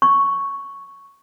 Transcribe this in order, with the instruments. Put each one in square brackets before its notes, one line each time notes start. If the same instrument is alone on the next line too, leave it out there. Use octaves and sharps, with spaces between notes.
[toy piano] C#6